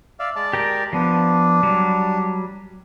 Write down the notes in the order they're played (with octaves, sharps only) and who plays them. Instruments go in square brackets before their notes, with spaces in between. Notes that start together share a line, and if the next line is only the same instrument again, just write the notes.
[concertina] D5 E5 F5
G#3 D5 A5
[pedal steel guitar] G4 A#4 G5
[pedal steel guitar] F3 B3 [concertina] D4
[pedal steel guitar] F#3 G3